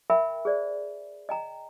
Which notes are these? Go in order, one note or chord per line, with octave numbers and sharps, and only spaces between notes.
A#4 E5 G5 B5
G#4 C5 D5
D#5 G5 A#5